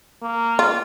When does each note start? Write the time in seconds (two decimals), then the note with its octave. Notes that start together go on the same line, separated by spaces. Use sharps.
0.22 A#3
0.59 F4